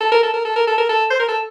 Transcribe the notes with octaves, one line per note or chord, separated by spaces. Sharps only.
A4
A#4
A4
A#4
A4
A#4
A4
A#4
A4
C5
A#4
A4